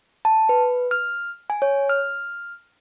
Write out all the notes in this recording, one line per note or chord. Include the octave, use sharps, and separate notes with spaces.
A5
B4
F6
G#5
C#5
F6